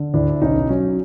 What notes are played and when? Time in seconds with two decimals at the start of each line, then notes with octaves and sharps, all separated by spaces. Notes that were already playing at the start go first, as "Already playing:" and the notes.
Already playing: D3
0.14 D2 D4 E4
0.41 B1 C#4 D#4
0.69 F#3 C#4